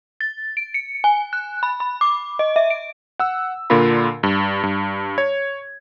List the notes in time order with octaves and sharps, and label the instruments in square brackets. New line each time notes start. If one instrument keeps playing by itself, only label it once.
[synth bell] A6
D7
C#7
G#5
F#6
B5
B5
D6
D#5
E5
D7
[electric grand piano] F#5 E6
A#2 D3 F4 A#4 B5
G2
G2
C#5 G#6